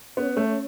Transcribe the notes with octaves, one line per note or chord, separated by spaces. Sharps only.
B3 C#4
A3